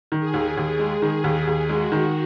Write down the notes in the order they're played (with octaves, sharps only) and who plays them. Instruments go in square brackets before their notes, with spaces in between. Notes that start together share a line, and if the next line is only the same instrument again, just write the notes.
[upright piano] D#3
[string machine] G#4
[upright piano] D#2
[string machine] G#4
[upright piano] D#2
G#3
D#3
D#2
D#2
[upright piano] G#3 [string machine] F#4
[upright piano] D#3